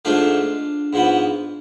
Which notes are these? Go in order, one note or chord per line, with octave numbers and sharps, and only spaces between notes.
G#2 F3 A3 D4 F4
G#2 F3 B3